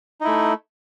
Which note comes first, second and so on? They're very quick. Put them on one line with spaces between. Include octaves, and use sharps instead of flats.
D#4 E4 A3